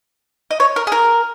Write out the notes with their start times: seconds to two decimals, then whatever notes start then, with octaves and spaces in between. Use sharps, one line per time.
0.51 D#5
0.60 C#5
0.76 A#4
0.87 G#4
0.92 A#4